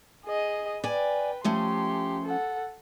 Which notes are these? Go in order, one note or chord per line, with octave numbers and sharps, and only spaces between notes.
G#4 D#5
B4 D5 G5 G#5
F3 A3 C#4 G4 C6
A4 F#5